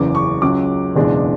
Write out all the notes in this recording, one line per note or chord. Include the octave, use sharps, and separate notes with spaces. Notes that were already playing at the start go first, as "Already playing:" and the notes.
Already playing: F#1 E2 C#3 E3 D6
C#6
C#2 C#3 F#3 D6
F#1 E2 B2 G#3 D4